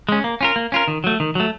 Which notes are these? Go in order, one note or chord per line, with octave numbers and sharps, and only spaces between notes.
G#3 C#4
A#3
C#4 F4 A#4
A#3
C#4 F4 A#4
D#3
F#3 A3
D#3
F#3 A3